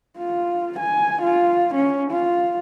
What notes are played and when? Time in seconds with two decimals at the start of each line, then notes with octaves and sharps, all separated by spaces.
0.18 F4
0.80 G#5
1.22 F4
1.75 C#4
2.12 F4